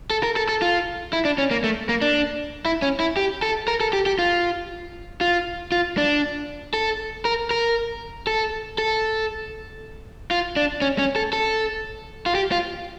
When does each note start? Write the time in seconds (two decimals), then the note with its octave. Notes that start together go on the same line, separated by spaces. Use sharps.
0.10 A4
0.23 A#4
0.36 A4
0.49 A4
0.62 F4
1.13 E4
1.25 D4
1.38 C#4
1.51 A#3
1.64 A3
1.89 A#3
2.02 D4
2.65 E4
2.82 C#4
3.00 E4
3.17 G4
3.42 A4
3.68 A#4
3.81 A4
3.93 G4
4.06 G4
4.19 F4
5.21 F4
5.72 F4
5.98 D4
6.74 A4
7.25 A#4
7.51 A#4
8.27 A4
8.78 A4
10.31 F4
10.56 D4
10.82 C#4
10.99 C#4
11.16 A4
11.33 A4
12.26 F4
12.35 G4
12.52 F4